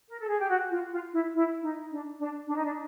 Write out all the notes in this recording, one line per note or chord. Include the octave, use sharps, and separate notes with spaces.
A#4
A4
G#4
G4
F#4
F4
F4
E4
E4
D#4
D4
D4
D4
D#4
D4